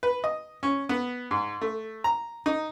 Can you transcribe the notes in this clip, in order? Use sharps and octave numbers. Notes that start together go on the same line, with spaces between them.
B4
D#5
C#4
B3
G#2
A3
A#5
D#4